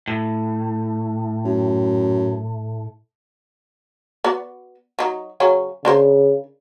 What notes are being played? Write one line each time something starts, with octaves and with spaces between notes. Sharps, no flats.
A2
F#2
B3 F#4 D5
F#3 D#4
C#3 F#3 C#4
C#3 D4 A#4 C5